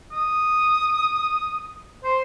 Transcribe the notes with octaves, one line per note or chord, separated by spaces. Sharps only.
D#6
C5